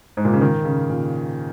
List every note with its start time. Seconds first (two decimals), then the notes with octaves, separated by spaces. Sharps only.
0.17 G#2
0.25 A#2
0.33 C#3
0.41 D#3
0.65 C#3
0.90 A#2